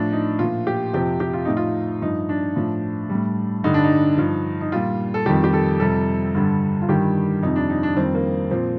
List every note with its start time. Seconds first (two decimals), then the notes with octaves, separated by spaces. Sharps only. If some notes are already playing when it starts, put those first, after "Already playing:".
Already playing: A2 F3 D4
0.13 D#4
0.39 A#2 F3 F4
0.67 G4
0.93 F2 C3 F3 G4
1.20 G4
1.33 F4
1.45 A2 F3 D#4
1.57 F4
2.02 G2 F3 D#4
2.29 D4
2.56 A2 F3
3.09 A2 G3
3.64 G2 D3 G3 D#4
3.74 D4
3.84 D#4
4.18 G2 F3
4.61 D#4
4.72 A#2 G3 F4
5.14 A4
5.26 F2 D#3 G3 G4
5.44 G4
5.53 A4
5.80 F2 C3 G3 A4
6.34 G2 D3 G3
6.81 F4
6.88 G2 D#3 G3 G4
7.43 F2 C3 G3 D#4
7.56 D4
7.70 D#4
7.83 D4
7.96 F2 D#3 G3 C4
8.15 A#3
8.51 A#2 F3 C4